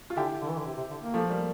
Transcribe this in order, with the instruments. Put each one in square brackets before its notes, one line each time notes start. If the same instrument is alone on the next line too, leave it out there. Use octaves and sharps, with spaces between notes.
[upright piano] F4
[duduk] D3 [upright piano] E4 G4
[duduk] D3
E3
D3
C3
C3
D3
A#3
[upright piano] F3 A3
G3 A#3